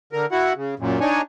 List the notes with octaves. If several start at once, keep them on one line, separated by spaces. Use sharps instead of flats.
D3 A#4
E4 F#4 F#5
C#3
F#2 A#2
D4 D#4 C#5 G#5